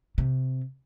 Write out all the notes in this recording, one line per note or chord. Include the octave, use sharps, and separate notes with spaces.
C3